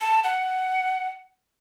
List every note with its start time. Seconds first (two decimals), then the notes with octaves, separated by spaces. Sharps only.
0.01 A5
0.24 F#5